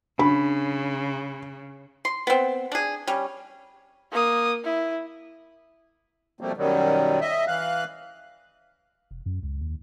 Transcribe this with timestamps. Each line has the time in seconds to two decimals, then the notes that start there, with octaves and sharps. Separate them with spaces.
0.19 C#3 D4 B5
2.05 C6
2.27 B3 C4
2.72 D4 G#4
3.07 G3 C#4
4.12 A#3 D#6
4.64 E4
6.41 B2 F3 G3 A3 A#3 C4
6.57 F#2 B2 D#3 F#3 G3
7.21 D#5 E5
7.47 E3 F5 F#6
9.11 E1
9.26 F#2
9.43 C#2
9.61 D#2